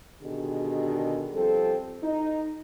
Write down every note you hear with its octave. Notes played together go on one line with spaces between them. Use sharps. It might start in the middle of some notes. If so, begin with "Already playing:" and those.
B2 D3 D#3 D4 G4 G#4
F3 G3 C4 A4
D#4